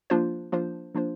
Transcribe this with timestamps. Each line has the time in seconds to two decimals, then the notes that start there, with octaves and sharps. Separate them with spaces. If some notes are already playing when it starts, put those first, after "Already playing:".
0.10 F3 A#3 D4 F4 C5
0.52 F3 A#3 D4 F4 C5
0.95 F3 A#3 D4 F4 C5